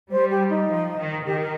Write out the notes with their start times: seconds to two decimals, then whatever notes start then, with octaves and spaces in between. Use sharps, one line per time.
0.11 G3 C5
0.30 G4
0.50 D#4
0.68 F3
0.98 D#3
1.26 D#3 G4
1.41 A#4